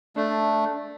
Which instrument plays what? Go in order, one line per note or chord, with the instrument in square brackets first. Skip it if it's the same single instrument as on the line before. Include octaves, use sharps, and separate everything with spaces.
[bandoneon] A3 [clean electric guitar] D4